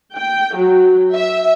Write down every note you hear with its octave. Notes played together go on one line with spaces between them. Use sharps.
G5
F#3
E5